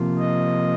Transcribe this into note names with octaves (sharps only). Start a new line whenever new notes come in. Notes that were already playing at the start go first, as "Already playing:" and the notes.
Already playing: C3 F3 A#3 F4
D#5